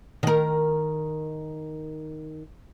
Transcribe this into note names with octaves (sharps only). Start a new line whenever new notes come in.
D#3 A#4